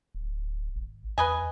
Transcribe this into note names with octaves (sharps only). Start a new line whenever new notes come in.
D1
G#1
E2 B4 D#5 G#5